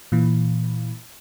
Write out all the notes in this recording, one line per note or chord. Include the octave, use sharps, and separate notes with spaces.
A#2 E3